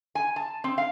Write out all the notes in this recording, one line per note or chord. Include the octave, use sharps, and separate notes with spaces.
G#5
A5
C4
F5